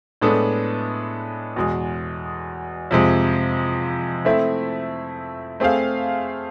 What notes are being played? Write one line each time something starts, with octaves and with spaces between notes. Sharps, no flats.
A2 G#3 B3 D4 A4
E2 B2 G#3
F2 C3 F3 G#3
A3 C4 E4 A4 E5
A3 C4 G#4 C5 F5